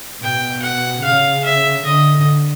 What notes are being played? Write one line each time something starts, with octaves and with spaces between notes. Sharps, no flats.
B2 G5
F#5
C#3 F5
E5
D3 D#5